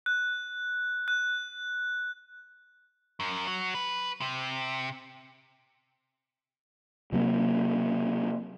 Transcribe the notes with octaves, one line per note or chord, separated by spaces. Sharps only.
F#6
F#6
F#2
F#3
B4
C3
C3 F#3 A#3